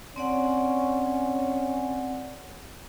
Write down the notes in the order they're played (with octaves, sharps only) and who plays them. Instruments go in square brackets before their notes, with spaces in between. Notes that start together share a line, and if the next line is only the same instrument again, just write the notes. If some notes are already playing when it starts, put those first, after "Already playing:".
[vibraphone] C4 D5 F#5 [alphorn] C#4